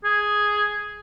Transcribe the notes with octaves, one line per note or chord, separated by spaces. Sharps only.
G#4